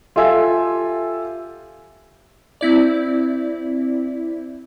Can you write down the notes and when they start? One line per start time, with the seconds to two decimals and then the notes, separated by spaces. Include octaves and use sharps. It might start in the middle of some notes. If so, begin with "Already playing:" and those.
0.16 F4 G4 A4 E5 G#5 E6
2.61 C4 E4 D5